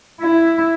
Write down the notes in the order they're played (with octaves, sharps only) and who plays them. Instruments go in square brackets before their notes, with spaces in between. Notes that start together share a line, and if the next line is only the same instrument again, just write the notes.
[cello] E4